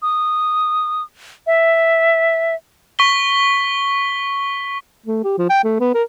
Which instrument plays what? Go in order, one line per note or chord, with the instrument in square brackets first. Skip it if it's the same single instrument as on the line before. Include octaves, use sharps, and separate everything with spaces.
[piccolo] D#6
E5
[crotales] C#6 B6 G7
[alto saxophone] A3
G4
F3
G5
A3
B3
A#4